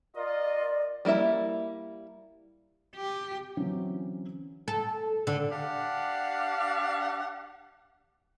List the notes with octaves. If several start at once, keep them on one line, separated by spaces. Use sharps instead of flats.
F4 A#4 D5 D#5
G3 A#3 E4 E5
G4
D3 E3 F#3 C4 C#4
A4
D3
D4 G4 F5 F#5